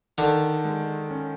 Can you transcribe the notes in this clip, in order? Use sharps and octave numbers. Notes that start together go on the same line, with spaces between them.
D3 D#3
G#3
C#4